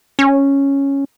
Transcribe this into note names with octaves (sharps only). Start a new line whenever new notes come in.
C#4